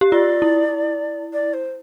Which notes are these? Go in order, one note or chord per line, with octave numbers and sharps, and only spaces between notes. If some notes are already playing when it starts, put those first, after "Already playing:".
G4
F4 D5
E4
D5
C5